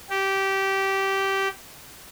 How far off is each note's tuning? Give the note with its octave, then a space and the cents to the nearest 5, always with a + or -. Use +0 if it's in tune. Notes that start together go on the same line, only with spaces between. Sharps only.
G4 -15